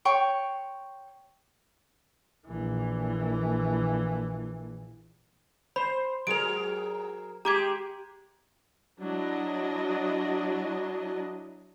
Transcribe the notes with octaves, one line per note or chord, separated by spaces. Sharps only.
C#5 G5 C6 C#6
A#1 E3
C5 B5
F#3 G#4 A#4 D7 F7
G#3 G4 A#5 D6 G#6
F#3 D4 E4 D#5